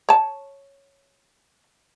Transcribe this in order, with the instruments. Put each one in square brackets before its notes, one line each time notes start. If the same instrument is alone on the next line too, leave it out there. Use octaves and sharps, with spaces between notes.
[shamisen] C#5 A5